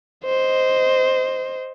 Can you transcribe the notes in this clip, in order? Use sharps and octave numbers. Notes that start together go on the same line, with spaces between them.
C5 D#5